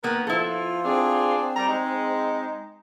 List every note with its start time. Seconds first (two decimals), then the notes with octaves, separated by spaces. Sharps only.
0.03 D#3 A#3 B3 A#4
0.27 F3 E4 F4 A4
0.84 C4 D4 G#4
1.38 C4
1.56 G3 A#5
1.68 G#3 D#4